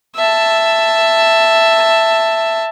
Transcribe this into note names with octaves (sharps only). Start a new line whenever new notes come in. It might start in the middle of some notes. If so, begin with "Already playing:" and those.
E5 A5